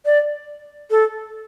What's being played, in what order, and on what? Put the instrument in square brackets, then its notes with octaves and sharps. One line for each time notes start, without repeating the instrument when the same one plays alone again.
[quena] D5
A4